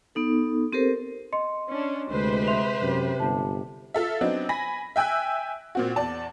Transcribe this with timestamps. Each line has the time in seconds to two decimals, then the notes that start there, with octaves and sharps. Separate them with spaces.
0.15 B3 D#4 A4
0.73 C4 G4 A4 A#4 C5
1.33 D#5 C6 C#7
1.69 C#4 D4
2.11 D2 C3 G#3 B4 C5
2.48 E5 C6 F7
2.82 F#2 C3
3.20 G1 A5
3.94 F4 A4 E5
4.21 F#3 B3 C4 D4 D#4
4.49 G#5 B5 A#6 B6
4.96 E5 G5 G#5 E6 F#6
5.75 A#2 C4 F#4
5.96 E2 D5 A5